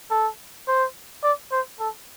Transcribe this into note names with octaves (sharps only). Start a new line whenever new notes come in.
A4
C5
D5
C5
A4